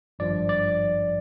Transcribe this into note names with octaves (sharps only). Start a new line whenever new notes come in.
G#1 G2 F3 D5
D5